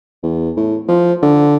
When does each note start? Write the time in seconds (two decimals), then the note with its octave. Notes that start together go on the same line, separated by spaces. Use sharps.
0.23 E2
0.57 A2
0.89 F3
1.22 D3